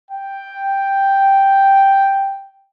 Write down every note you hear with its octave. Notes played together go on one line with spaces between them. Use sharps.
G5